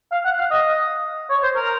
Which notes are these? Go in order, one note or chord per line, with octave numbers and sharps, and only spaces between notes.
F5
F#5
F5
D#5
C#5
C5
A#4